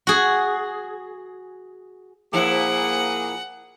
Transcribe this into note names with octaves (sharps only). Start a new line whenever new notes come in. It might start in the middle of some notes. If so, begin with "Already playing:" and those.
F#4 G#4
A#2 F3 A#3 E4 G#4 F#5